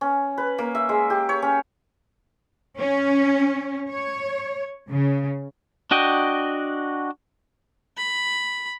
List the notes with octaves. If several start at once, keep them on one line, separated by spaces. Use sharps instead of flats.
C#4
B4
A#3
E5
G#3
G4
C#5
C#4
C#4
C#5
C#3
D4 F#4 D#5 G5
B5